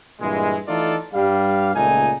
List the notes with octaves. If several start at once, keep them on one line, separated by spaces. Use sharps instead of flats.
G2 A#2 E3 G#3
E3 A3 D#4 F4 A4 D5
G2 G3 G4 F5
C#2 A#2 A3 D#4 G#5